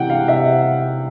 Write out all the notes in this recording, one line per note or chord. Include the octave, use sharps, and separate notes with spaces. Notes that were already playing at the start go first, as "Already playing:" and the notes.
Already playing: C3 E3 F#5 G5
F5
C3 E5